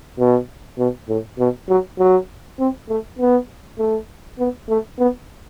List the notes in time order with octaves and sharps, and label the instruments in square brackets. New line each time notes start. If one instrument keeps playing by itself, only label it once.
[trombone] B2
B2
A2
B2
F#3
F#3
C4
A3
B3
A3
B3
A3
B3